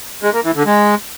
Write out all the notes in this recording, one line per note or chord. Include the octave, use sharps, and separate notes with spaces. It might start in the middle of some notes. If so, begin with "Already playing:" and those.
G#3
A#3
E3
D3
G#3